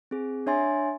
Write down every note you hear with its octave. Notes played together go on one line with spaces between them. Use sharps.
C4 G#4
D4 C#5 E5 G#5 C6 A6